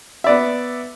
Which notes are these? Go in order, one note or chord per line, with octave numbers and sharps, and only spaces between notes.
B3 D5 E5